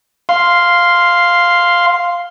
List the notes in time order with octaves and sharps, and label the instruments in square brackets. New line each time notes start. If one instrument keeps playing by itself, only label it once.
[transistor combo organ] F5 C6